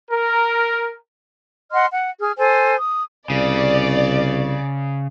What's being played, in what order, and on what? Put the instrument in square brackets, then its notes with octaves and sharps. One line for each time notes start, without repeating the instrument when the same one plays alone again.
[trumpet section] A#4
[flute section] D#5 F#5 C6 F6
F#5
G#4 F6
A4 C5 G#5
D#6
[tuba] C2 [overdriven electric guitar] C#3 [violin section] D5